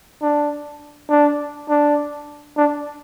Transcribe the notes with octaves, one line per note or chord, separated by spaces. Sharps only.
D4
D4
D4
D4